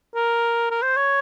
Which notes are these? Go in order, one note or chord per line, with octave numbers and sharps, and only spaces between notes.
A#4
A#4
C5
C#5